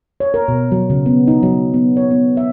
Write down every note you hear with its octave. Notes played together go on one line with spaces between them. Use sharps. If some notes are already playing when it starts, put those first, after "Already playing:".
C#5
A#4
B2
F#3
C#3
B3
D#4
F#3
B3
C#5
B3
E5